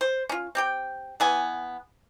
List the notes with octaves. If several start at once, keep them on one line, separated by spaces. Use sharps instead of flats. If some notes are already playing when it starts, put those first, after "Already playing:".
C5
C#4 F4
C4 G4 G5
E3 B3 G#5